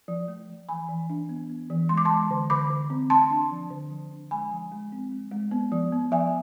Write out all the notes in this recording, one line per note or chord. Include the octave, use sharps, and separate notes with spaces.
F3
A3
F3
E3 G#5 B5
E3
D4
B3
B3
E3
G#3 C6
D6
G#3 A5 C6
D3
D3 B5 D6
D3
C4
A3 A5 C6
D4
F3
D3
F3
D4
G#3 G#5 B5
F3
G#3
C4
G#3
G#3
B3
F3
B3
F3 E5 G#5